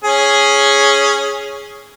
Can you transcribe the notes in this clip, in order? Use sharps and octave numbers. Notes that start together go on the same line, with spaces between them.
C#4 G#4